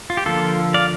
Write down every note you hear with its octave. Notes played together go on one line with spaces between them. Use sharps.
F4
G4
D3 F3 A#3 F4 A4
D5 F5